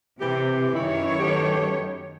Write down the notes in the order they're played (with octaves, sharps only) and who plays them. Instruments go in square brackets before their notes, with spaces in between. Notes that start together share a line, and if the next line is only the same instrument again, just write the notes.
[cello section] C3 [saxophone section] E3 G4
[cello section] F#2 D#3 C#5 [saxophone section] E3 E4
[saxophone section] A3 B3 G4